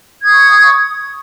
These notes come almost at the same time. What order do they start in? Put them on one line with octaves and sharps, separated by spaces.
G#6 D#6 C#6